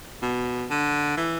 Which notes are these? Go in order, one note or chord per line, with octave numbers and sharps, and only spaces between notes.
B2
D3
E3